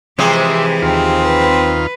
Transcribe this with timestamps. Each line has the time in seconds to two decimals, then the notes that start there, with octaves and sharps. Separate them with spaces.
0.19 C3 E3 F3 G#3 G4 E5 C6 D6
0.82 D#2 C4 F4
1.23 B4